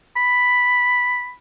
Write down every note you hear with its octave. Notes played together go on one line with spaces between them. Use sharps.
B5